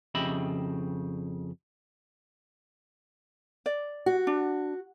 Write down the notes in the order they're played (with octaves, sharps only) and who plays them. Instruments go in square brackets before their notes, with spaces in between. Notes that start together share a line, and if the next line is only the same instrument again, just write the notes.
[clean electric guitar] F2 C#3 G4 D#5 E5 B5
[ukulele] D5
[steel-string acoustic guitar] F#4
[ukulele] D4